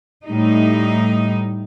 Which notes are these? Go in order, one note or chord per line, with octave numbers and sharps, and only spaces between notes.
A2 G3 D#4